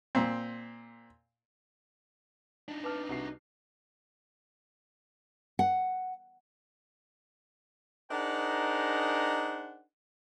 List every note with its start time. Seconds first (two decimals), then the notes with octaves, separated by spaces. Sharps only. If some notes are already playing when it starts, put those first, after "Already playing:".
0.15 A#2 C4
2.68 D4 D#4
2.84 B4 A5 D6 F6
3.09 C2 F#4 C7
5.59 F#5
8.11 D4 D#4 G#4 A#4 C5 F#5